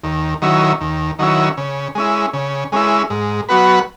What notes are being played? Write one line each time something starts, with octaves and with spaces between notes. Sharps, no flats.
D#2
D#3 F#3 C#4 E4
D#2
D#3 F#3 C#4 E4
C#3
G#3 C#4 E4
C#3
G#3 C#4 E4
G#2
F#3 B3 F#4 B4